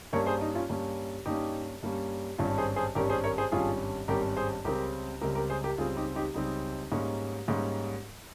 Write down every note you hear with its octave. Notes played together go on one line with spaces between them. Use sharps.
G2 G3 A#3 C#4 A#4 C#5
G#4 C5
D#4
C#4 F4
G2 G3 A#3 C#4
G2 G3 A#3 C#4 D#4 G4
G2 G3 A#3 C#4
G#1 G2 G3 C#4 F4
G#4 C5
G#4 C5
G#1 G2 G3 C#4 G4 A#4
G#4 C5
A#4 C#5
G#4 C5
G#1 G2 G3 C#4 F4 G#4
G#1 G2 G3 C#4 G4 A#4
G#4 C5
C#2 C#3 G3 C4 G4 A#4
C#2 C#3 G3 C4 G4 A#4
G4 A#4
G#4 C5
G4 A#4
C#2 C#3 G3 C4 F4 G#4
D#4 G4
D#4 G4
C#2 C#3 G3 C4 D#4
G#2 G3 A#3 C#4
G#2 G3 A#3 C#4